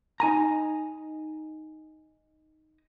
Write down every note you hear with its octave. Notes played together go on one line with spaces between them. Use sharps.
D#4 G#5 A#5